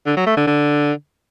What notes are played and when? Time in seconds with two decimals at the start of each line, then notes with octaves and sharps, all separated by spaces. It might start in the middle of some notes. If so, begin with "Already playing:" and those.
0.06 D3
0.16 F#3
0.27 A3
0.37 D3
0.47 D3